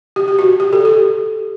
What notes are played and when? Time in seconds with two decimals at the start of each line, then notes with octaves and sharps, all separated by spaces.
0.16 G4
0.28 G4
0.39 F#4
0.60 G4
0.73 A4
0.85 G4